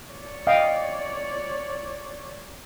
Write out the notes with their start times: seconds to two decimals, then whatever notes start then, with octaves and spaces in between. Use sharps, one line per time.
0.11 C#5 D5
0.47 D#5 F5 G5